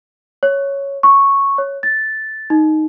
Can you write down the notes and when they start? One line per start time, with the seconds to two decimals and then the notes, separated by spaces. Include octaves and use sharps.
0.43 C#5
1.03 C#6
1.58 C#5
1.83 A6
2.50 D#4